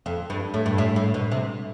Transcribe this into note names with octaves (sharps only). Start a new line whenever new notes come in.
F2
G2
A2
G2
A2
A2
B2
C3